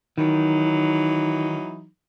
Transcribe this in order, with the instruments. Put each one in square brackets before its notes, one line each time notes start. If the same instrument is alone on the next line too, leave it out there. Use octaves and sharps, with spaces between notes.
[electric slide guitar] D#3 [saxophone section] E3 F#3 D#4